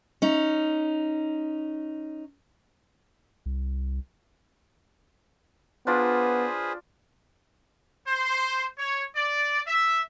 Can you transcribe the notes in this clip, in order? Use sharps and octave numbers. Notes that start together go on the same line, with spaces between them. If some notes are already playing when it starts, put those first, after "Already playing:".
C#4 D#4
C2
B3 D4 F4 G#4 B4 C5 D5
C5
C#5
D5
E5